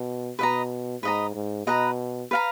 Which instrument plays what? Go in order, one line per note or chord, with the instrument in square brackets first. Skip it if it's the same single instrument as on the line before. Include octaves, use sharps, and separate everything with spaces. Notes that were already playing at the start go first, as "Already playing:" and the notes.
Already playing: [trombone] B2
[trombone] B2 [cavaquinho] B4 D#5 A#5
[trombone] G#2 [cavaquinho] B4 D#5 A#5
[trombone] G#2
[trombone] B2 [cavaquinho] B4 D#5 A#5
[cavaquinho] B4 F5 A#5